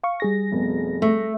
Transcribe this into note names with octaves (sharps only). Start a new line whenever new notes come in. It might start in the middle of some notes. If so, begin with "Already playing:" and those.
F5 C#6
G3 G#4 A#6
F1 B2
A3